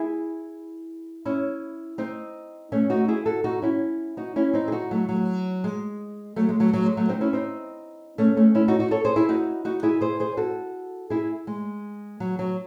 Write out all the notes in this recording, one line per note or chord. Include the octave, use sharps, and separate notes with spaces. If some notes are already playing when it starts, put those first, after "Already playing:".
Already playing: E4 G#4
C#4 E4
C4 D#4
A3 C#4
D#4 F#4
E4 G#4
F#4 A4
D#4 F#4
C#4 E4
D#4 F#4
C#4 E4
C4 D#4
G#4
D#4 F#4
F#3 A3
F#3
G#3
F#3 A3
G#3
F#3 A3
F#3
G#3
F#3 A3
C4 D#4
C#4 E4
C4 D#4
A3 C#4
A3 C#4
C#4 E4
D#4 F#4
D#4 F#4
A4 C#5
G#4 C5
E4 G#4
D#4 F#4
D#4 F#4
E4 G#4
G#4 C5
G#4 C5
F#4 A4
E4 G#4
G#3
F#3
F#3